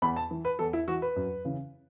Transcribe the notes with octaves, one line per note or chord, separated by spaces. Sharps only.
E2 B5
A5
E3
B4
E2 A4
E4
E3 F#4
B4
F#2
C#3 E3